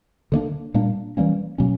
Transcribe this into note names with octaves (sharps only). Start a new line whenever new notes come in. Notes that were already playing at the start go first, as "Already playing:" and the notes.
D3 G3 A#3 D4
A#2 G3 A#3 D4
E3 G3 A#3 C#4
B2 F#3 A#3 C#4